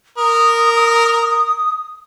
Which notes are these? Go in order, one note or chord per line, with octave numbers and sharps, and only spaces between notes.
A#4 D#6